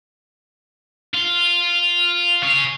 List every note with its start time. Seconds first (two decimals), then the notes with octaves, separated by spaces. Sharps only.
1.14 F4
2.43 G#4 C#5